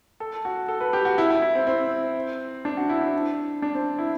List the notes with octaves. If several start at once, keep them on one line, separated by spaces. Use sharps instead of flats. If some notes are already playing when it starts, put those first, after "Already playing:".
A4
F#4
A4
B4
G4
F#4
E4
E4
E4
C4
C4
D4
F#4
E4
D4
D4
C4
E4